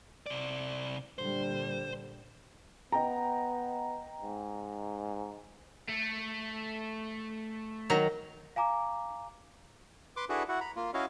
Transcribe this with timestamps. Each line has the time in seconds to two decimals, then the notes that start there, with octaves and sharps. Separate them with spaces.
0.26 C3 D5
1.18 A#2 D3 G3 C5
2.92 B3 D#5 G5 A#5
4.22 G#2
5.88 A3
7.90 D#3 F#3 A#5
8.56 F5 G#5 A#5 D6
10.17 B4 C6 D6
10.29 D4 E4 F#4 G#4 A4 B4
10.49 E4 F#4 F#5
10.61 A#5 B5
10.76 A#3 F4
10.94 C#4 E4 F#4 C#5 D#5 F5